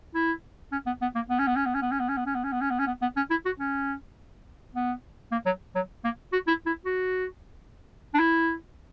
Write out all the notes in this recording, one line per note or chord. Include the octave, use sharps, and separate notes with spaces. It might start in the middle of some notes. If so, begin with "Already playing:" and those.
E4
C#4
B3
B3
A#3
B3
C#4
B3
C#4
B3
C#4
B3
C#4
B3
C#4
B3
C#4
B3
C#4
B3
C#4
B3
C#4
B3
B3
C#4
E4
F#4
C#4
B3
A#3
F#3
F#3
A#3
F#4
E4
E4
F#4
D4
E4